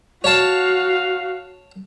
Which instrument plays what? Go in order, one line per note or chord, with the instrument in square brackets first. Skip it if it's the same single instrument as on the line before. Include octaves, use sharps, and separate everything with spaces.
[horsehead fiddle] F#4 [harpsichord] C#5 A5 [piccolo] F5